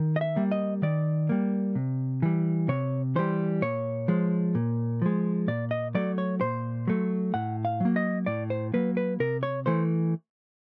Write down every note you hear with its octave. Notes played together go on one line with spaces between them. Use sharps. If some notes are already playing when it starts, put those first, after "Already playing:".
Already playing: D#3
D#5
E5
G3 A#3
D#5
D#3 D5
G3 A#3
C3
E3 G3
C3 C#5
E3 G3 C5
A#2 C#5
F3 G#3
A#2
F3 G#3
A#2 D5
D#5
F#3 A3 D5
C#5
A#2 C5
F#3 A3
A2 F#5
F5
F#3 A#3
D#5
A2 D5
C5
F#3 A#3 B4
B4
C3 A#4
C#5
E3 A3 C5